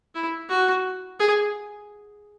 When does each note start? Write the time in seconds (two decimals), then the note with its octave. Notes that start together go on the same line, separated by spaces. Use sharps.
0.15 E4
0.50 F#4
1.20 G#4